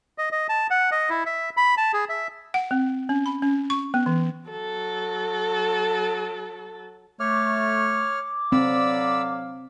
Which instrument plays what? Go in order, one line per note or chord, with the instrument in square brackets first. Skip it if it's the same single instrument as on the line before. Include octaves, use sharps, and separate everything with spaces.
[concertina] D#5
D#5
A5
F#5
D#5
E4
E5
B5
A5
G#4
E5
[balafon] F#5
C4
C#4
B5
C#4
C#6
B3
E3
[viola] F#3 A4
[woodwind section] A3 [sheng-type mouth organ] C#5 F6 [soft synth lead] D6
[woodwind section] D3 F#3 F5 [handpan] C4 [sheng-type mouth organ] D5 B5 E6